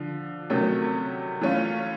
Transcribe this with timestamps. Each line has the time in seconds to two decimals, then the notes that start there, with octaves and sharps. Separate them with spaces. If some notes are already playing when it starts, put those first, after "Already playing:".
Already playing: D3 F3
0.50 C3 D#3 F#3 A3 C#4
1.41 E3 A3 C#4 F4